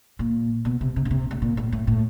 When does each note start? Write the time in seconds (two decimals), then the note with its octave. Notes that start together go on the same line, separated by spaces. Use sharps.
0.19 A#2
0.65 B2
0.81 C3
0.96 C3
1.05 C#3
1.11 C3
1.31 A2
1.42 A#2
1.57 A2
1.72 A2
1.87 A2